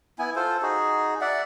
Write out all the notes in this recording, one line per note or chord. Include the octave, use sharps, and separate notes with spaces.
B3 E4 G#5
F4 A4 C5
D#4 F#4 G#4
D5 E5 F#5